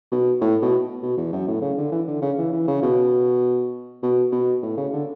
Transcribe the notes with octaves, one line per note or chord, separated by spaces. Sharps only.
B2
A2
B2
B2
E2
F#2
A2
C#3
D3
E3
D3
C#3
E3
E3
C#3
B2
B2
B2
A2
C#3
D3